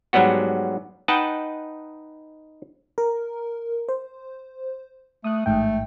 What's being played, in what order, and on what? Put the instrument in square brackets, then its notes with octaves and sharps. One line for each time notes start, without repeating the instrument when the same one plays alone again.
[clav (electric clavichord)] G#2 F#3 G3 B3 F#4
D#4 B4 D#5 F#5 G5 A5
[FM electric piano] A#4
C5
[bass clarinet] A3 [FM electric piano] D#6 F#6
[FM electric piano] A1 G#2 G5 [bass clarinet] A3